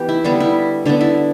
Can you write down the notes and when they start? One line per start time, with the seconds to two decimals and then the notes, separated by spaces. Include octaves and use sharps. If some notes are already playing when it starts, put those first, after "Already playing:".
Already playing: E3 B3 G4
0.09 E4
0.24 D3 G3 B3 D4
0.41 E4
0.85 D3 B3 D4
1.01 E4